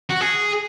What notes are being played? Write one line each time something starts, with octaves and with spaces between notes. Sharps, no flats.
F#4
G#4